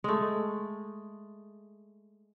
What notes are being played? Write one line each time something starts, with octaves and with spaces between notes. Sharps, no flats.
G#3 A3